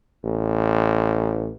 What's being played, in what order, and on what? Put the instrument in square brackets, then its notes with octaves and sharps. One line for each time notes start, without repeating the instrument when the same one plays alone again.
[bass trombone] A1